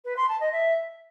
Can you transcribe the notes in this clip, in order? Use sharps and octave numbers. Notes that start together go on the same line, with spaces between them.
B4
C6
A5
D#5
E5